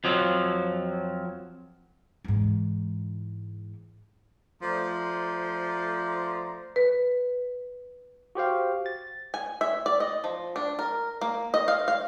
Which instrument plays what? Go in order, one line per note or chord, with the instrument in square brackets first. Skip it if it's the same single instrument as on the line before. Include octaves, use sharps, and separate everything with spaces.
[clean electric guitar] F2 F3 F#3
[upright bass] G#2 E3
[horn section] F3 A3 C5 D5 A#5
[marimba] B4
[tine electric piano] F#4 G4 C5 F5
A6
[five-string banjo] G#5
E5
D5
D#5
F3
D4
A#4
A#3
D#5
F5
F5